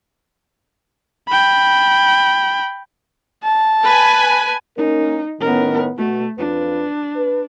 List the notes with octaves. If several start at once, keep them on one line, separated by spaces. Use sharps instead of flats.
G5 B5
A5
B4 G#5
A#3 C#4 D#4 A#4
A2 D#3 B3 C#4 A#4
B2 A3 F#4
F2 D4 F4 B4
B4